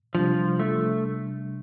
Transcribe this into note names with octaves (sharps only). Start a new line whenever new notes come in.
C3 F3 G3 D4
A3